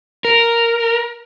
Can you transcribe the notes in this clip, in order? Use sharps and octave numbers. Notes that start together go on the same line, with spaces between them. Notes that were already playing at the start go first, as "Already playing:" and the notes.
A#4